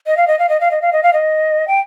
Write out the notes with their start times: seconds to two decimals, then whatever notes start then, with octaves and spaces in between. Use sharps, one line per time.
0.07 D#5
0.17 F5
0.28 D#5
0.39 F5
0.49 D#5
0.61 F5
0.71 D#5
0.82 F5
0.93 D#5
1.03 F5
1.13 D#5
1.68 G5